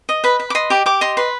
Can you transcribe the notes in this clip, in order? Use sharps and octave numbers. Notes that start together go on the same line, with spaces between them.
D#5
B4 B5
B4
D6
D#5 C6
G4 D6
G4 D6
D#5 C6
B4 C6